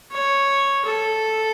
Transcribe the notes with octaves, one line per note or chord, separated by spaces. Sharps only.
C#5
A4